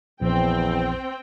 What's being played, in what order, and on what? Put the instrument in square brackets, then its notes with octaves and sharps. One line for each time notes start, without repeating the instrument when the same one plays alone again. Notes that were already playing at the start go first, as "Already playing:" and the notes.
[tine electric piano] A#1 [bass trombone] E2 [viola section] C4 G5